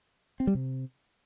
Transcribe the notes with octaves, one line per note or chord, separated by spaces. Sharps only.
C4
G3
C3